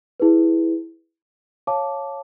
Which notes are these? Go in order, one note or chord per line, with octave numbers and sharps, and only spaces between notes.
E4 G#4 B4
C#5 F5 A5 D6